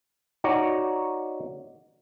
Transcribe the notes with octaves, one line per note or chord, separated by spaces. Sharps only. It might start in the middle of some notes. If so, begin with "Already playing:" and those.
D#4 F#4 C#5 D5